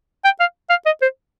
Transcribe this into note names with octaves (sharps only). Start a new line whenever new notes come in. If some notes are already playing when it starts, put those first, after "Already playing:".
G5
F5
F5
D#5
C5